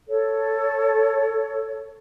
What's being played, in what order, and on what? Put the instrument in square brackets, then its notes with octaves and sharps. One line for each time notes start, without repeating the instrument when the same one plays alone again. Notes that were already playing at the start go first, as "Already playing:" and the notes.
[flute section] A4 C#5